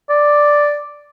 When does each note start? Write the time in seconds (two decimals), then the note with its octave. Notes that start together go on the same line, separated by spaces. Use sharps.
0.10 D5